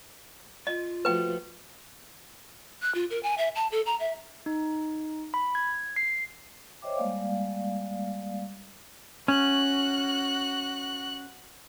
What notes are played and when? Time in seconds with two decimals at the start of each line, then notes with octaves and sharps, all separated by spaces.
0.67 F4 D#5
1.05 F3 A3 F#4 B4 G5
2.82 F#6
2.95 F4
3.10 A#4
3.23 G#5
3.38 E5
3.55 A5
3.72 A4
3.86 A#5
4.00 E5
4.46 D#4
5.34 B5
5.55 G#6
5.96 C7
6.82 C5 C#5 D#5 E5 G5 D6
6.97 G3 G#3 A#3 D5 F5
9.28 C#4 F#4 F#6